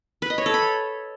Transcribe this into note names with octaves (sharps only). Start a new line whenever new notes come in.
B4
D#5
C#5
A4
B5